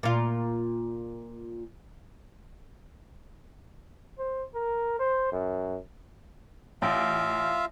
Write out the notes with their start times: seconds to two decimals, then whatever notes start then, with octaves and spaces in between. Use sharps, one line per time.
0.03 A#2 F4
4.18 C5
4.55 A#4
4.99 C5
5.32 F#2
6.82 A1 F4 E5 F5 G5 A6